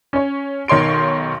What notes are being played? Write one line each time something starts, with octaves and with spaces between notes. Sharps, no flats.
C#4 C#5
B1 D#3 C#5 C6 D7